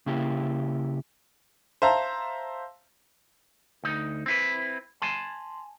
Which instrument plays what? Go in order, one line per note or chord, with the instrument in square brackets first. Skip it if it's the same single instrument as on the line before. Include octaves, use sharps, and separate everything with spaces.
[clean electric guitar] C#3 A#3 E4 G4
[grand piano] C5 E5 F5 A5 A#5
[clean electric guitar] D2 D#4
C4 E4 B4
G#5 A5 C6